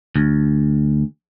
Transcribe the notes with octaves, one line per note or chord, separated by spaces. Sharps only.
D2